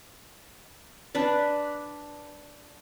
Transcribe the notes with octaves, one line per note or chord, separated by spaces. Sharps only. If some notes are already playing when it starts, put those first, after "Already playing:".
D4 B4 D5